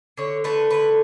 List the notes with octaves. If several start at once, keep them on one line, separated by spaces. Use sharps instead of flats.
D3 C#5
A3 B4
D3 B4